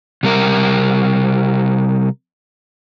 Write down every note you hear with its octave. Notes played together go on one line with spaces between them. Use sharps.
C3 G3 A#4